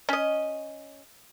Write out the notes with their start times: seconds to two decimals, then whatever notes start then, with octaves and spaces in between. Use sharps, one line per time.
0.09 C#4 D#5